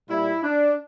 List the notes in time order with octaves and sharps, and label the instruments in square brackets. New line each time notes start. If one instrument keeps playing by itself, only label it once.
[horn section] A#2 G3 E4
D4